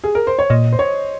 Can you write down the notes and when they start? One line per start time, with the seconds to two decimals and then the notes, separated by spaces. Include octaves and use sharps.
0.04 G#4
0.15 A#4
0.27 C5
0.39 C#5
0.50 A#2 D#5
0.72 C5
0.79 C#5